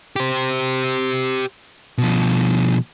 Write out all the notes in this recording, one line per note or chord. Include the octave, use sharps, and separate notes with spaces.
G4 C5
B2 F3